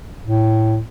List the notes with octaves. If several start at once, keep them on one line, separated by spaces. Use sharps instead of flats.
A2